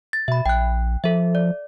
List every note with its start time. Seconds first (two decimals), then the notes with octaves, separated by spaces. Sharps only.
0.13 A6
0.28 B2 E5 B5
0.46 A#1 G5 F#6
1.04 F3 A4 E5
1.35 D5